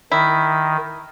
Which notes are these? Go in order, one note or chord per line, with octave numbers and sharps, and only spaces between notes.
D#3 E4